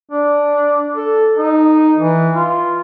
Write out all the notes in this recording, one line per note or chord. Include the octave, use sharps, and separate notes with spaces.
D4
A4
D#4
E3
F4